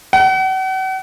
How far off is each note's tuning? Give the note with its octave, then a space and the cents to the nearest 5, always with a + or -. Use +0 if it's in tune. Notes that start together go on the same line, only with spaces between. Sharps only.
F#5 +40